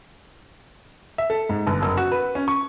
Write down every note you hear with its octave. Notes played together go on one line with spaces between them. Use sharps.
E5
A4
G#2
G1
F#1
F#4
B4
C#4
C#6